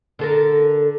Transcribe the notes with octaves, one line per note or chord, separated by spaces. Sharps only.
D3 A4 A#4